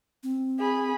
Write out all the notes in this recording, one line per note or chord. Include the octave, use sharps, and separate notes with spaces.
C4
G#4 B5